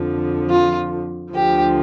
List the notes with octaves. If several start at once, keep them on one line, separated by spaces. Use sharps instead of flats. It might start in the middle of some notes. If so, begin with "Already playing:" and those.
Already playing: F2 D3 F3
F4
D2 D3 F3 G4